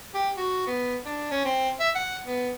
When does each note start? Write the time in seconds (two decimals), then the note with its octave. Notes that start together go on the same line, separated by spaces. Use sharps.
0.14 G4
0.37 F#4
0.67 B3
1.06 D4
1.31 C#4
1.45 C4
1.80 E5
1.95 F#5
2.27 B3